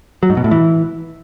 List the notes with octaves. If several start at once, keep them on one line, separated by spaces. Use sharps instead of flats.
F#3
G#2
B2
A2
E3